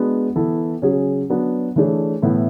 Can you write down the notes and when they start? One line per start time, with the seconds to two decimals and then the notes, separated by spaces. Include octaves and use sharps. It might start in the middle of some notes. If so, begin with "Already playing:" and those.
Already playing: G#3 B3 D4 F#4
0.36 E3 B3 E4 A4
0.82 C#3 F#3 C#4 G#4
1.30 F#3 B3 D4
1.76 E3 A3 D4 G#4 C#5
2.22 A2 E3 B3 E4 A4